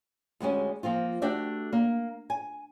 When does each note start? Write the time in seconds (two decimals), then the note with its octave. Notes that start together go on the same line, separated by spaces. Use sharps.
0.40 D2 G3 G#3 C#4
0.83 F3 A#3 C4 F4
1.22 A3 D4 F#4 G4 D5 E5
1.73 A#3
2.30 G#5